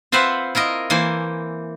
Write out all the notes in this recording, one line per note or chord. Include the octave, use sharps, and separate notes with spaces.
C4 F4 B4 C5 E5 F#5
E4 F4 A#4 D#5
E3 A#3 C5 G#5